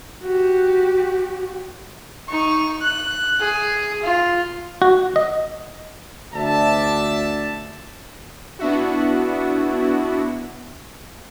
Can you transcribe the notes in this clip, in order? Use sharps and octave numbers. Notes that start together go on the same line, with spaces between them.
F#4 G4
D#4 C#6
F#6
G#4
F4
F#4
D#5
D2 D4 E5 A5
B3 D4 E4 F#4